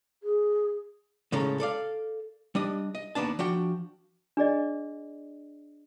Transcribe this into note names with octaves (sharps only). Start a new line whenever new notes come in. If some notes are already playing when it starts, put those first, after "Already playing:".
G#4
A2 C#3 G#3 C#4 A4 A#5
A4 D5 F5
G3 D4 D#5
D#5
D#2 A#3 B3 D4 A5
F3 D4 F#4 G5
D4 G#4 D5 D#5